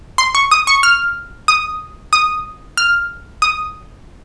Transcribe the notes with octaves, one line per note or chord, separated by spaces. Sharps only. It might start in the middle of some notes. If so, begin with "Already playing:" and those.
C6
C#6
D#6
C#6
F6
D#6
D#6
F6
D#6